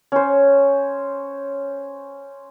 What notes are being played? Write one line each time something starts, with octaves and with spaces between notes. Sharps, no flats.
C#4 C5